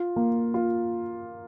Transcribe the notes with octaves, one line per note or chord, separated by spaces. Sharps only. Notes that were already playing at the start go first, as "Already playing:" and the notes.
Already playing: F4
A#3
F4